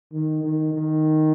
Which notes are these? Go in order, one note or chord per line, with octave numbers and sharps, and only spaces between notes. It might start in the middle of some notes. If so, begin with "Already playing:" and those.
D#3
D#3
D#3